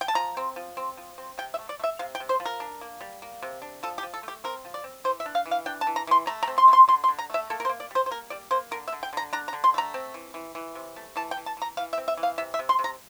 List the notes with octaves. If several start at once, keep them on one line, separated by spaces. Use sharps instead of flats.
G5
A5
F3 A#5
C4
F3
C4
F3
C4
C3 G5
E5
A3
D5
A3
E5
C3 F5
G5
C3
C5
F3
A#4
D4
A#3
G3
A#3
C3
D4
F3 A4
G4
F3
A4
A3 G4
C4 A#4
F3
D5
C4
E3 C5
E5
D4
F5
E3
F5
D4 G5
A5
E3
A#5
E3 C6
A3 A#5
A#5
C4
C6
A3
C6
D3 C6
C6
D3
A#5
A3 E5
A#3 A4
A#4
C5
A#3
D5
G3 C5
C5
A#3 A#4
G3 D5
A#3 C5
D3 A#4
E5
D3
G5
D3 A#5
D4 A#5
A#5
D3
C6
A3 A#5
C4
E3
E3
E3
C3
A3
E3 A5
G5
E3
A5
E3 A#5
E3 F5
E5
C4
E5
E3
F5
C3 E5
E5
C3
C6
C3
A#5